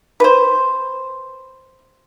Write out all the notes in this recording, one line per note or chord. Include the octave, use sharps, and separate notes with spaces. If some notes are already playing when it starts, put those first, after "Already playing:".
B4 C5